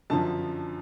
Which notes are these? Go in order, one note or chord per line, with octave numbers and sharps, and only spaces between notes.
F#2 D3 F3 A5